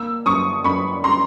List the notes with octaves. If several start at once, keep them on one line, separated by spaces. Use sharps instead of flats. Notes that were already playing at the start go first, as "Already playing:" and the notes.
Already playing: A#3 E6
F#2 C#6 D#6
F#2 B5 C#6
A#5 C6